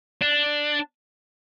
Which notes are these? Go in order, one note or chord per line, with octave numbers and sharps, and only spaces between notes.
D4